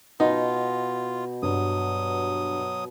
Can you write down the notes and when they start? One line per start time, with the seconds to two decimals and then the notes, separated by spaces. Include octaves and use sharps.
0.20 B2 D#4 F4
1.43 G2 F#3 D#6